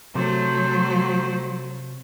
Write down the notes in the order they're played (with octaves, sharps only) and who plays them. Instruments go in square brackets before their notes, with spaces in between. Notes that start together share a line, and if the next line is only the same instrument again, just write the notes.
[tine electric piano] C3 [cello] F#3 [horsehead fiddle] A3 C5